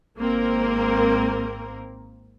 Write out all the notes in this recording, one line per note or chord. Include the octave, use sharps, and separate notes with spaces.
G#1 A#3 C4 A#4